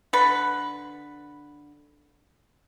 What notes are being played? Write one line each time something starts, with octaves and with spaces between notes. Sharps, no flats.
D3 B4